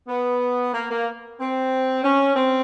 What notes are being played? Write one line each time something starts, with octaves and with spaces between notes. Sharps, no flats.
B3
A#3
A#3
C4
C#4
C4